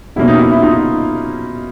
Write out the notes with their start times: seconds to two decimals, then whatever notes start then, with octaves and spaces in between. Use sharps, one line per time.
0.16 B2 F#3 A#3 C#4 E4
0.28 D#4
0.39 E4
0.52 E4
0.62 D#4 F4